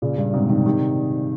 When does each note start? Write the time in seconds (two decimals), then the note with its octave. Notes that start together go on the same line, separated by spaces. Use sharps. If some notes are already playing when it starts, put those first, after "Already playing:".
0.02 A#2 C#3
0.17 G2 A#2
0.33 G#2 C3
0.49 C3 D#3
0.66 C3 D#3